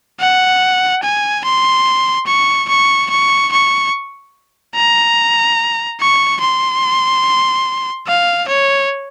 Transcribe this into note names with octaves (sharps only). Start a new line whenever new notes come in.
F#5
G#5
C6
C#6
C#6
C#6
C#6
A#5
C#6
C6
F5
C#5